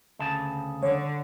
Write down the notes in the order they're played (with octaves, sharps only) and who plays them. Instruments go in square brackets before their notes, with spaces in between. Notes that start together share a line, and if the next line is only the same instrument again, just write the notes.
[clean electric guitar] D2 C#3 A5
[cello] D3 [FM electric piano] C#5